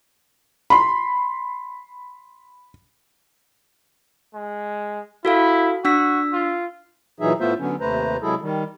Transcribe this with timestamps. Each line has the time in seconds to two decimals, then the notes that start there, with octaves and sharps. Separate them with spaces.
0.70 B5 C6
4.34 G#3
5.25 E4 F#4 A4 F5
5.85 D4 F#4 E6 B6
6.33 F4
7.20 A#2 E3 F#3 D#4 G#4 E5
7.40 A2 A3 B3 F4 C5 E5
7.59 D3 F#3 B3 C#4
7.80 D#2 C3 A3 B4 C5 A#5
8.22 C3 F#3 G#3 E4 G#4 A4
8.41 D#3 G3